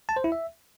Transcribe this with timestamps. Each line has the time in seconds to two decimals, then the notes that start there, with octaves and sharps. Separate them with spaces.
0.09 A5
0.16 C5
0.24 E4
0.32 E5